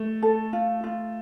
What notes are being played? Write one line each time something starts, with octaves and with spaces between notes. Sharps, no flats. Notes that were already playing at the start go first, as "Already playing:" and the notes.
Already playing: A3
A4
F4
F4